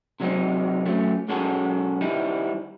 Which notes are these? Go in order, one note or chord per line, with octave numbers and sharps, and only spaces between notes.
C3 F#3 G#3 A3 C4 D#4
F#3 A3 C#4
B1 G#3 C#4 F#4 G#4 A4
D#3 G3 D#4 E4